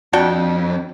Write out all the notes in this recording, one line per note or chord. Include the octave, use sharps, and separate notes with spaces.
F2 D4 F#4 G5